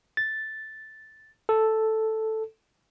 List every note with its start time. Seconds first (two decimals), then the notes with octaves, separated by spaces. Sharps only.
0.17 A6
1.49 A4